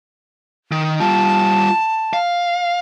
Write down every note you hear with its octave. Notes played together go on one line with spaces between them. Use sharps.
D#3
G3 F4 A5
F5